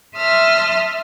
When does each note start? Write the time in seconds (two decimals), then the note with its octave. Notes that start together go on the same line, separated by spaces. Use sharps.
0.15 E5 A5 C6 D#6 F6